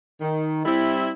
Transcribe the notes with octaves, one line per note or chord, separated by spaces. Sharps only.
D#3
G3 C4 E4